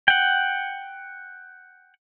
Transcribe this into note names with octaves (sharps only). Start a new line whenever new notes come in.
F#5 G5